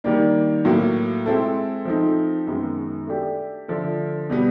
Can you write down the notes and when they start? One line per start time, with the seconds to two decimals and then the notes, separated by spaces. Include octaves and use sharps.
0.04 D#3 G3 A#3 D4
0.65 A2 F#3 A#3
1.26 G#3 C4 E4 A4
1.85 F3 A3 C4 D#4
2.47 F#2 D#3 G#3 B3
3.07 A3 D4 G4
3.68 D3 F3 A3
4.30 B2 G3 B3